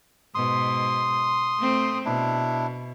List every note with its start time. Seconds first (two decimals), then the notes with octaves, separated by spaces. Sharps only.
0.35 G#2 B2 C6 D#6
1.59 A3 C4
2.05 B2 D4 E4